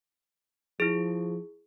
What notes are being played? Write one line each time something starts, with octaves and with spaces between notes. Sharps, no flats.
F3 E4 G#4